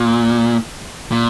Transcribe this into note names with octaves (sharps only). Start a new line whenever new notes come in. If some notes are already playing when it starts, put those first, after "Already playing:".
Already playing: A#2
A#2